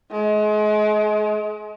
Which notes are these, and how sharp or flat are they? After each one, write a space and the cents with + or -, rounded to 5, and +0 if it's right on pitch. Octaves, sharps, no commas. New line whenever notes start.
G#3 +35